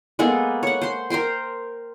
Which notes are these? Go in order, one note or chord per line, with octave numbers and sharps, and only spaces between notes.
G#3 A#3 B3 A4
C#5 F#5
C5 C6
A#4 C5 G5 C6